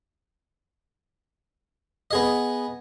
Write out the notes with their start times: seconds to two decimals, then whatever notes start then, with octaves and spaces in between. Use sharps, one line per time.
2.11 B3 G#4 D#5